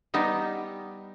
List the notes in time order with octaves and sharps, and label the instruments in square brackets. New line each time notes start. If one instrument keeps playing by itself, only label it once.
[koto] G3 B3 D#4